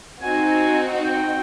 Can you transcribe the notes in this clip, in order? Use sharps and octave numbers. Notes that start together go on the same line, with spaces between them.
C4 D#4 F#4 G#5
G5